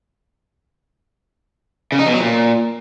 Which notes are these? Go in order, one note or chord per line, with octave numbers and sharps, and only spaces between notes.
C#3
D#4
B2
F#3
A#2